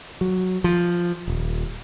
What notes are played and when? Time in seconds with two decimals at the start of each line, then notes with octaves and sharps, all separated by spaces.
0.21 F#3
0.64 F3
1.27 D#1